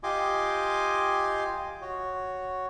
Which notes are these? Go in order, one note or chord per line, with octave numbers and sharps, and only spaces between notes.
F4 G4 D#5 G#5 C6 D6
F#4 C#5